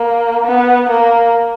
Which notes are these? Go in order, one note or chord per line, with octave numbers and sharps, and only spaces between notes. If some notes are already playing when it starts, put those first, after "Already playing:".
Already playing: A#3
B3
A#3